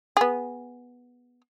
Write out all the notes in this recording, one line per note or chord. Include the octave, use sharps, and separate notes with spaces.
B3 G#4